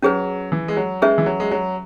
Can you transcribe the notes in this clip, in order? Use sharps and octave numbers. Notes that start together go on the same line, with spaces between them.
F#3 C#4 G#4 B4
E3
G#3
F#3
G#3 C#4 G#4 B4 E5
E3
F#3
G#3
F#3